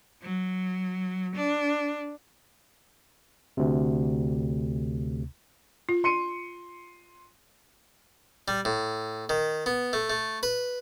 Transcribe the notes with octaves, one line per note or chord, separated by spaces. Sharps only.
F#3
D4
D2 C3
F4
C6 C#7 D#7
G3
A2
D#3
B3
A3
A3
B4